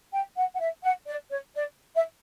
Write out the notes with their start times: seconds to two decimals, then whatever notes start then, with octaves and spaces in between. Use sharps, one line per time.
0.12 G5
0.36 F#5
0.55 F#5
0.60 E5
0.84 F#5
1.07 D5
1.31 C#5
1.55 D5
1.96 E5